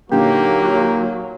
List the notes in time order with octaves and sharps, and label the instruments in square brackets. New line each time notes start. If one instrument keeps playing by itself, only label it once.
[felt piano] A#2 D3 D#4 [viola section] F#3 [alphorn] A#3 [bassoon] G4